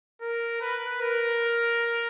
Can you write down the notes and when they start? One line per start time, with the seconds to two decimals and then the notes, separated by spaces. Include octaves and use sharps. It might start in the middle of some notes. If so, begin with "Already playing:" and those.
0.22 A#4
0.61 B4
1.01 A#4